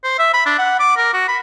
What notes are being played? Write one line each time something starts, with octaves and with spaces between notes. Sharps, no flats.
C5
E5
B5
D4
F#5
D6
A#4
F#4
B5